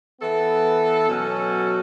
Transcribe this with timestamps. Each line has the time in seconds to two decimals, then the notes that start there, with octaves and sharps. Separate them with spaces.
0.20 E3 B3 A4
1.08 B2 F#3 C#4 F#4 A4